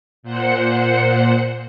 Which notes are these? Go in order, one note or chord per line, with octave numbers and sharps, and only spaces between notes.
A#2 C5 F#5 C#7